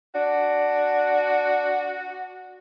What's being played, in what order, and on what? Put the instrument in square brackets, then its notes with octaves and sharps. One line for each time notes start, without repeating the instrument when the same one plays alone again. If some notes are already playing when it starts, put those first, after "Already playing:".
[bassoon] D4 [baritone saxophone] F#4